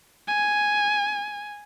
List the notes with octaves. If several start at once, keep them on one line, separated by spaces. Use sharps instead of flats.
G#5